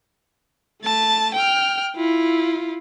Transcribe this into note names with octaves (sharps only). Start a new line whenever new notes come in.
A3 A5
G5 F6
E4 F4